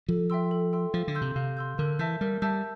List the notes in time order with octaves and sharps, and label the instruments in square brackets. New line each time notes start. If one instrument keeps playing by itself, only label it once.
[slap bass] F3 [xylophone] A4
[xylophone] E5 G5 C6 E6
A4
E5 G5 C6 E6
[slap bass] F3 [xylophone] F5
[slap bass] D3
[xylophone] C6 E6 G6
[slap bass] C3
[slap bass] C3 [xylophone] F5
[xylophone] C6 E6 G6
[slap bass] D3 [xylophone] A#4
[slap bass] E3 [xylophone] E5 A5 E6 G6
[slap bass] G3 [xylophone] A#4
[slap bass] G3 [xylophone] E5 A5 E6 G6